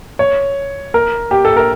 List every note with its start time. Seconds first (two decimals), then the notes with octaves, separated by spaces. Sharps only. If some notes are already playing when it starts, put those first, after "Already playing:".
0.19 C#5
0.94 A#4
1.31 G4
1.45 A4
1.57 A#4